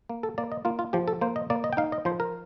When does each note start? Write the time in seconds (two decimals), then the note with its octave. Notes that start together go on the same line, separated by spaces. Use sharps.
0.09 A#3
0.23 A4
0.38 A#3 D5
0.52 D#5
0.65 A#3 F4
0.79 F4
0.93 F3 G4
1.08 A4
1.21 A#3 C5
1.36 D#5
1.50 A#3 D5
1.64 D#5
1.73 G5
1.77 D#4 F5
1.92 D#5
2.05 F3 C5
2.20 A#4